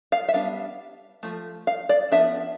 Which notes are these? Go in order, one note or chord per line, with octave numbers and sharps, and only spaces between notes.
F5
E5
G3 B3 D4 F5
F3 A3
F5
D5
F3 B3 D4 E5